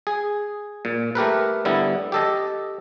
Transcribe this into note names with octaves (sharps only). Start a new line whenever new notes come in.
G#4
A#2
A3 G4 A#4 B4
D3 G3 B3 E4
G4 A4 D#5